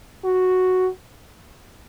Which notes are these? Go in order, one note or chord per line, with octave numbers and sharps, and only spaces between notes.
F#4